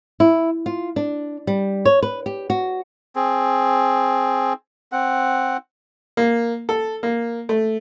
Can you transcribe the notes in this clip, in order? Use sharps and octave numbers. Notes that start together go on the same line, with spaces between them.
E4
F4
D4
G3
C#5
B4
G4
F#4
C4 G#4
C4 F#5
A#3
A4
A#3
A3